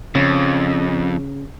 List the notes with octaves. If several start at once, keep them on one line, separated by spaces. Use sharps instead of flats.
F2 C#3